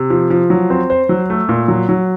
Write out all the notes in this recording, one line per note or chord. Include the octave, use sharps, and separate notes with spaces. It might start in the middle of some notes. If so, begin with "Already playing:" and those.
Already playing: C3
F3
F3
F#3
C4
C5
F#3
A3
A#2
F#3
F#3